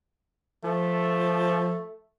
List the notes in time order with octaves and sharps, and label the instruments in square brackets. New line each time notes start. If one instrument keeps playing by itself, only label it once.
[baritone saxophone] F3 [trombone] A3